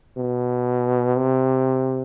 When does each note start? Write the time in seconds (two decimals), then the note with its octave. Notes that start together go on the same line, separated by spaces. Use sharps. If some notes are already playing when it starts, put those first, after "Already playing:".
0.18 B2
1.16 C3